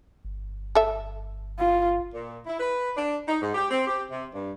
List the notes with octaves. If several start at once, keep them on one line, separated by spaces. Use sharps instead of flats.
G1
A4 E5
F4
A#2
E4
B4
D4
D#4
G#2
G4
C4
G4
C3
G2